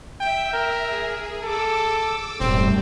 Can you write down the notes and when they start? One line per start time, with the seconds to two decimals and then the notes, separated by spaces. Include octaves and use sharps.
0.20 E5 G5
0.53 A#4
0.88 G#4
1.43 A4 D6 E6
2.40 E1 F#2 A2 G3 C4